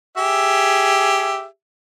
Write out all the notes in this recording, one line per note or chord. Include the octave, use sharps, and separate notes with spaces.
G4 G#4 E5